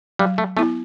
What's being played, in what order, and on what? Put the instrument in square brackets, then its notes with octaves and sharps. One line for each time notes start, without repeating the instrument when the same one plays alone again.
[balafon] F#3 [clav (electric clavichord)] G3
[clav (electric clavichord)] A3
[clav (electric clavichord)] A3 [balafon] B3 E4